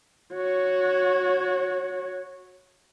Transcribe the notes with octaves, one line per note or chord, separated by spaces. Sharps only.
F#4 C#5